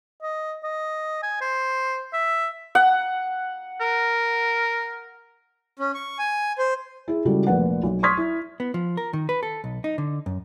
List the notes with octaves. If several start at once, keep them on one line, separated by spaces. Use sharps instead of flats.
D#5
D#5
G#5
C5
E5
F#5
A#4
C#4
C#6
G#5
C5
E4 G#4
C#3 G3 G#3 E4 F#4 A4
F1 A#1 A#3 B4 F#5
B1
C6 C#6 D#6 F6 G#6 B6
E4
B3
F3
A#4
D#3
B4
A4
B1
D#4
D3
F#2